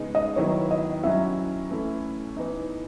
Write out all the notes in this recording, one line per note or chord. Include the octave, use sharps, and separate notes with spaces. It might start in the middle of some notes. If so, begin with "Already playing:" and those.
Already playing: C#3 G#3 B3 D#4
D#5
D#3 F#3 B3 E4 C#5
D#5
F#3 C#4 E4 E5
E3 A3 C#4 E4
E3 B3 D#4